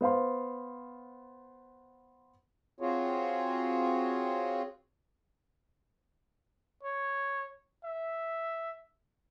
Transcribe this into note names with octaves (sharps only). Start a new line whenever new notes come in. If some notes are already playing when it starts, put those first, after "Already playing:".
B3 C5 F5 C6
C4 F4 F#4 G#4 C#5
C#5
E5